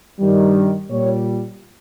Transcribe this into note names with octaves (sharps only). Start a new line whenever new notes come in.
G2 D#3 G3
A#2 G3 C#5